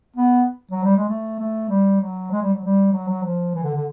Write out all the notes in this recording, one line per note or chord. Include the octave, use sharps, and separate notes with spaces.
B3
F#3
G3
G#3
A3
A3
G3
F#3
G#3
G3
F#3
G3
F#3
F#3
F3
E3
D3
D3